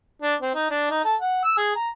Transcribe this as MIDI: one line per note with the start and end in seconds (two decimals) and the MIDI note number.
0.22 0.34 62
0.41 0.54 60
0.55 0.67 63
0.70 0.89 62
0.90 1.00 63
1.05 1.16 69
1.21 1.43 78
1.45 1.53 88
1.57 1.71 68
1.76 1.89 82